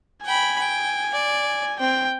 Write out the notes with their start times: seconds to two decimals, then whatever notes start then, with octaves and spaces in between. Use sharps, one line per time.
0.25 G5 G#5 B5
0.59 G5
1.14 D5
1.80 C4 G5